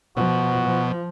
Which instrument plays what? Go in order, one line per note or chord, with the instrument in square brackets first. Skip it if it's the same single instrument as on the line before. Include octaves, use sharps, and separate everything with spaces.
[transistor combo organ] B2 [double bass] F3 [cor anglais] F#4
[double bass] F3